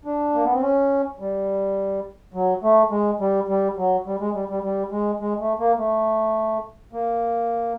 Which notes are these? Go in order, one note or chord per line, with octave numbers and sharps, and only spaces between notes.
D4
A#3
B3
C4
C#4
G3
F#3
A3
G#3
G3
G3
F#3
G3
G#3
G3
G3
G3
G#3
G#3
A3
A#3
A3
A#3